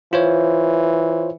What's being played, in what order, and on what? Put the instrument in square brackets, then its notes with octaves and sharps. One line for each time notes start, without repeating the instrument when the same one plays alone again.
[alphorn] E3 [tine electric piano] F4 C5 C#5